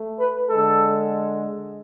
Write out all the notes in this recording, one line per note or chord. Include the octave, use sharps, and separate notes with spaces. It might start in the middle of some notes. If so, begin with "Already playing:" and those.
Already playing: A3
B4
D3 G#3 A4